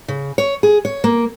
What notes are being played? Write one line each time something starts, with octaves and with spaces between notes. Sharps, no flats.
C#3
C#5
G#4
C#5
A#3